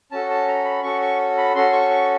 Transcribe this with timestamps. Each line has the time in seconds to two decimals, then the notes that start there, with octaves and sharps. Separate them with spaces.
0.12 C#4 F#4 A4 A5
0.30 A5
0.48 A#5
0.65 B5
0.83 C#4 F#4 A4 C#6
1.02 C#6
1.38 B5
1.55 C#4 F#4 A4 C6
1.73 C#6
1.90 C#6